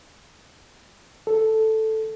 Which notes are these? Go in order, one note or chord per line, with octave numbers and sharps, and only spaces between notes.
A4